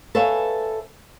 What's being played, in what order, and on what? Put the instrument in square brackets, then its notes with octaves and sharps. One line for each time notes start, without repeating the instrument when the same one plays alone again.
[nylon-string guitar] A4 B4 C#5 E5 F5 G#5